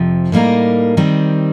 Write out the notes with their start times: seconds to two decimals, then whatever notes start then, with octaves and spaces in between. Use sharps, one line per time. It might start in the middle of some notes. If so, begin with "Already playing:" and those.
Already playing: F2 C3 F3
0.32 A2 G3 A#3 D#4 A#4
0.97 D#3 G3 C4